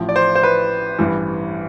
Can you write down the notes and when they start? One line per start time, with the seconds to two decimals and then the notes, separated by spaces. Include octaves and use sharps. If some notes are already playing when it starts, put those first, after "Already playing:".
Already playing: A1 A2 F3
0.09 D5
0.16 C5
0.35 C5
0.43 B4
0.99 A1 G2 E3